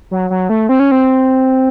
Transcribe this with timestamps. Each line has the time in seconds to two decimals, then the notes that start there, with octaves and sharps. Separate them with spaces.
0.11 F#3
0.30 F#3
0.49 A3
0.69 C4
0.80 C#4
0.92 C4